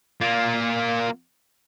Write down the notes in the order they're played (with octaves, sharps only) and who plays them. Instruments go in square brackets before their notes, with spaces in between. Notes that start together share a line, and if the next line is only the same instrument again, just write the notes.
[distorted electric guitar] A#3 F4